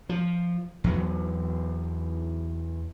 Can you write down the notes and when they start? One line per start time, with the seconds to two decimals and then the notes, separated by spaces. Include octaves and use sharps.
0.09 F3
0.84 E2 F#3 B3